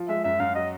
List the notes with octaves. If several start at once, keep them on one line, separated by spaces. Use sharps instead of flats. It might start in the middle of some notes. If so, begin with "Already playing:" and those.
Already playing: F3
G#3 E5
F#2 E5
F#2 F5
F#3 D#5